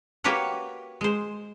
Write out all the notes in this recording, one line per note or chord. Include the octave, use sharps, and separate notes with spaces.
A#3 F#4 G4 B4 C#5 F#5
G#3 C5